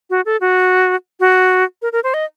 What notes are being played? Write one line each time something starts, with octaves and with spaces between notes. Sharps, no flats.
F#4
A4
F#4
F#4
A#4
A#4
C5
D#5